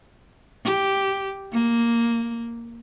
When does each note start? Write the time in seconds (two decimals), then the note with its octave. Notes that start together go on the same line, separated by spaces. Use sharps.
0.65 G4
1.53 A#3